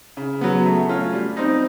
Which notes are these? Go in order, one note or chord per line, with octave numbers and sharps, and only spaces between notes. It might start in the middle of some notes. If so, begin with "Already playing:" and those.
C#3
F#3 B3
A3
C#4 F4
G3
C4 D#4